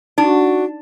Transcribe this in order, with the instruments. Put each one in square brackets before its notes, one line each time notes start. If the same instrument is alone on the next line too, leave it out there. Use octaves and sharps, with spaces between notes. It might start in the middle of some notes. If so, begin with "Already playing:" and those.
[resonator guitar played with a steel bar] D4 [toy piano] D#4 [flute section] F#4